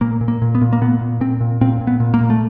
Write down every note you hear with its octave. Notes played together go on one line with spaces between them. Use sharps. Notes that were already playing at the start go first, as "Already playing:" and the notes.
A#2 A#3
A#2
A#3
A#2
B3
A#2
A#3
A#2 B3
A#2
A#2 C4
A#2
A#2 C4
A#2
B3
A#2
A#3
A#2
A3